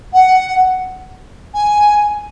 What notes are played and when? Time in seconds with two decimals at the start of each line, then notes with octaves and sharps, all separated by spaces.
0.13 F#5
1.54 G#5